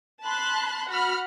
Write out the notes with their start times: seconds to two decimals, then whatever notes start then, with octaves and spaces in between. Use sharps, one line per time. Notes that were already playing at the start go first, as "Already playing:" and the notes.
0.23 A5 B5 C6 F#6
0.88 F#4 F#5 B5 F6